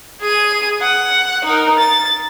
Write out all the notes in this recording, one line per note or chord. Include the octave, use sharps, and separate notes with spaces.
G#4 D#7
F#5
D#4 A#4
A6